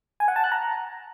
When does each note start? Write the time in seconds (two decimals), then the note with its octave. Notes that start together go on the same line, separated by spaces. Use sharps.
0.20 G#5
0.28 F#5
0.36 A5
0.44 F#6
0.52 A#5